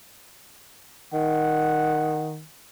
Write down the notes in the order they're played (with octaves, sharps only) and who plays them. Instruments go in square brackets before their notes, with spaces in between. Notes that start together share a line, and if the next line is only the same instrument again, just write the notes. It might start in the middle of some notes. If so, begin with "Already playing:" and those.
[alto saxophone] D#3 [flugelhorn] F#5